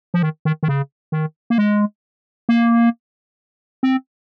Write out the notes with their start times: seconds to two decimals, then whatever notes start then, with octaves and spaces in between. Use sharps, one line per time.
0.14 F3
0.22 D#3
0.45 D#3
0.63 D#3
0.68 C#3
1.12 D#3
1.50 A#3
1.58 G#3
2.49 A#3
3.83 C4